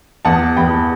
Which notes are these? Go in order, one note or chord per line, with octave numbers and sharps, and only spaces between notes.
E2 F#5 A5
E2 G5 B5